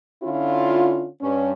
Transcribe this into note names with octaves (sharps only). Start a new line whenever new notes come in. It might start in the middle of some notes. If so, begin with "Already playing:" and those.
D3 C#4 E4 F4
G2 C#4